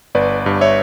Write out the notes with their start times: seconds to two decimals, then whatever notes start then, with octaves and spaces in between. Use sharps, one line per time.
0.15 G1 B4 D5
0.46 G2
0.61 C#5 E5